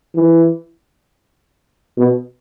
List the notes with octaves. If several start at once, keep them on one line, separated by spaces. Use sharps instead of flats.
E3
B2